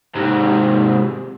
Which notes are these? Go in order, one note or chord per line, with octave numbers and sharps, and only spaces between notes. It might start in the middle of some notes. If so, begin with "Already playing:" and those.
G#2 C3